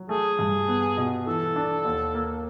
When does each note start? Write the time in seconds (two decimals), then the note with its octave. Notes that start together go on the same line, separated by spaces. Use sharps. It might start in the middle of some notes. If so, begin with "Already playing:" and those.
Already playing: F#3
0.09 A3 G#4
0.39 G2
0.68 B3
0.97 B2
1.27 E3 A4
1.56 D4
1.85 D#2
2.15 A#3